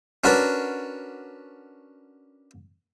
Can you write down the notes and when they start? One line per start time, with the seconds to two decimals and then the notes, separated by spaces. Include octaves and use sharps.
0.24 C#4 D4 F#4 A#4 B4 D5